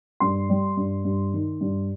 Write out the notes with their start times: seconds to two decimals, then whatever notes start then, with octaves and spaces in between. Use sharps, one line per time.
0.20 G2 C6
0.49 G3
0.77 G2
1.05 G2
1.34 D#3
1.61 G2